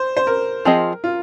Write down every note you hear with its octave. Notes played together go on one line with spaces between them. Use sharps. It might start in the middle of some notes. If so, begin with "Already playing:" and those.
Already playing: C5
C5
A#4
F3 C4 G#4 D#5
F4